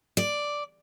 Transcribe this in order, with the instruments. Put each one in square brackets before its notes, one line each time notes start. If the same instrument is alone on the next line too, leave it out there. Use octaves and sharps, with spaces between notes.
[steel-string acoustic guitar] D5